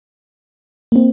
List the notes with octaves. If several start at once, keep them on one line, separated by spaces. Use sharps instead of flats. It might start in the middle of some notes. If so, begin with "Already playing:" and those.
A#3
C4